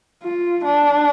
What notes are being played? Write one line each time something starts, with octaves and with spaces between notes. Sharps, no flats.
F4
D4